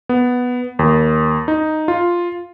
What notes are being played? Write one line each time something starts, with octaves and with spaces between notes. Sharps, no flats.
B3
D#2
D#4
F4